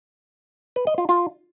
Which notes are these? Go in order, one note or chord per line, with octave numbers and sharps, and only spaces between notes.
B4
D#5
F4
F4